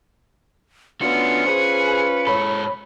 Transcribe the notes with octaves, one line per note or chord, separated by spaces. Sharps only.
B3 C#4 D4 F4 F#4 C#7
C#4 F4 G#4 B4 C5
G#2 A4 C#5 B5